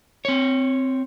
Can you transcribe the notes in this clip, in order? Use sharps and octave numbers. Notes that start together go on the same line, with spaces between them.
C4 C#5